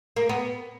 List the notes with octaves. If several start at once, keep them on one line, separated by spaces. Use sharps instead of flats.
A#3
B3